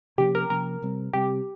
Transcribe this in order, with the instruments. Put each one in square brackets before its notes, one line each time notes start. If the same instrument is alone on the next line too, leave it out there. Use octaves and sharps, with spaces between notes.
[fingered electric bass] C3 F3 A#3 C#4 [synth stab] G4
[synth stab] A#4
[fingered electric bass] C3 F3 A#3 C#4 [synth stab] A#4
[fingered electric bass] C3 G3 C4
[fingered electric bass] C3 G3 C4 [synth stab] G4